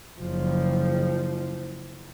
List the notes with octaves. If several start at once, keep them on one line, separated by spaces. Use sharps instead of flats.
F#1 F3